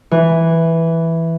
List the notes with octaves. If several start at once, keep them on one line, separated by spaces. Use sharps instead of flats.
E3